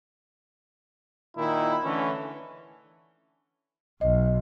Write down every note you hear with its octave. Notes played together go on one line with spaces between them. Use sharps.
A#2 D#3 D#4 E4
D3 E3 A3 C#4
B1 D#5